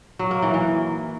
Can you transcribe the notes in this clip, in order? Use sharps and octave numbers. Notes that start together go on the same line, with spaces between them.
F#3
A#3
E3
E3